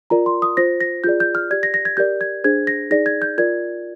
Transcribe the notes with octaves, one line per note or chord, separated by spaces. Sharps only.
F4 A#4 D5 A#5
C6
D#6
F4 C5 A#6
A#6
F4 G#4 D5 G6
G6
F6
G4 D5 G#6
A#6
A#6
G#6
G4 A#4 D5 G6
G#6
D4 G#4 C5 G#6
A#6
D#4 G#4 D5 A#6
G#6
G6
F4 A#4 D5 G#6